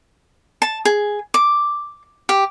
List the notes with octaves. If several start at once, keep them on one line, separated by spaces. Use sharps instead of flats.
A5
G#4
D6
G4